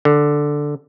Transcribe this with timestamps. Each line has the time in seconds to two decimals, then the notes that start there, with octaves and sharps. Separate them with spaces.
0.05 D3